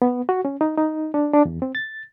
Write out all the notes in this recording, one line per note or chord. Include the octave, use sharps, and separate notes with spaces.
B3
F#4
C#4
D#4
D#4
D4
D4
E2
C4
A6